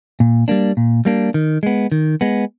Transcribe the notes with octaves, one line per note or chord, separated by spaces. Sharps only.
A#2
G3 A#3 D4
A#2
G3 A#3 D4
D#3
G#3 B3
D#3
G#3 B3